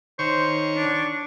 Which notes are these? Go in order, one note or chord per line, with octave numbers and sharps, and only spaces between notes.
D#3 C5 C#5 C#6
D4